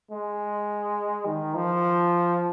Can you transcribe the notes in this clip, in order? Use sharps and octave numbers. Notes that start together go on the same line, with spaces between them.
G#3
D#3
F3